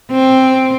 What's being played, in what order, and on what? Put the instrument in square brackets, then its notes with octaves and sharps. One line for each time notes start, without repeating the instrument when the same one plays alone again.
[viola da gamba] C4